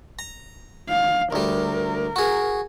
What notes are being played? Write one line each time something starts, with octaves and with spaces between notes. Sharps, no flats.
A#5
F5
D2 G3 A#4
F#4 G#4